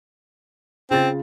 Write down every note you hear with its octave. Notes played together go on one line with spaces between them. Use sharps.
C#3 C4 F4 A6